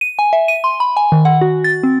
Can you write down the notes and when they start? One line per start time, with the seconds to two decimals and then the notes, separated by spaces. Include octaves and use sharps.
0.01 D#7
0.19 G#5
0.33 E5
0.48 D#7
0.64 C6
0.80 B5
0.97 G#5
1.12 D#3
1.25 F#5
1.41 F#4
1.64 A6
1.83 C4